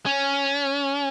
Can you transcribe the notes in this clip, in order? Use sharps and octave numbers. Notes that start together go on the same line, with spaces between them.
C#4